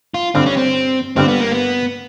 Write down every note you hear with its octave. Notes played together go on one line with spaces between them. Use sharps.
F4
G1 G2 D3 C4
C#4
C4
G1 G2 D3 C4
B3
A#3
B3